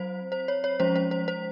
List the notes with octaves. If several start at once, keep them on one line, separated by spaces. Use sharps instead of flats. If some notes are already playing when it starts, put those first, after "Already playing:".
Already playing: F#3 C4 C5
C5
C#5
C#5
F3 G#3 C#4 C5
C5
C5
C5